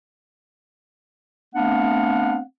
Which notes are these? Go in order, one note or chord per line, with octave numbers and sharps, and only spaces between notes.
A3 B3 C4 D4 F5 F#5